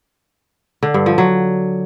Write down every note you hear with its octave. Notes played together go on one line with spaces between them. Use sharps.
D3
G2
F3
F#3